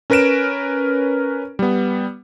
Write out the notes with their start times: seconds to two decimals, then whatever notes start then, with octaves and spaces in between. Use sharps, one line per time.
0.10 C#4 A#4 B4 A#6 D7 E7
1.59 G3 B3